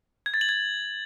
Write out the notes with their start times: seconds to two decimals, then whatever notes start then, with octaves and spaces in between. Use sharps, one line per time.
0.26 G#6
0.34 A6
0.41 F#7
0.49 G#6